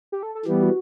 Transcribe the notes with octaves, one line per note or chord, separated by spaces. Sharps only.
G4
A4
A4
E3 G3 B3 G4
F#4